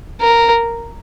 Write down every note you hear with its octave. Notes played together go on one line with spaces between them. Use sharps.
A#4